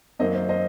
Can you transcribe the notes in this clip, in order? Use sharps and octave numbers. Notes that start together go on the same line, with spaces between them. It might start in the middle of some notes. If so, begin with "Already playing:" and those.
F#2 D#3 F#3 A#3 C5 D#5
C5
C5 D#5